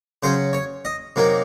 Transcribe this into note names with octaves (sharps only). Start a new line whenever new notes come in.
C#3 F#3 C#4 C5
C#5
D#5
C3 F#3 A#3 D#4